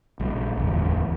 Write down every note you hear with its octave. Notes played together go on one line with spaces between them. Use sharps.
A#1 G3
D1 G1 E2